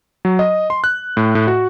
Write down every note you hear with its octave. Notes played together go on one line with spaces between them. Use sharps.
F#3
D#5
C6
F#6
A2
A2
F#4